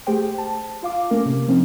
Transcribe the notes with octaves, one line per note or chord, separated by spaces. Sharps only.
A3 G4 G#4 C5 G5
A5
F4 F5 D6
A3 A#3 C#4 A#4
C3
F3 C4 C#4 D#4